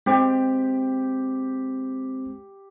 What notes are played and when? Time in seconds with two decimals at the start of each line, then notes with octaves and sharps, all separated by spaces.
0.06 G#3 C4 G4 C5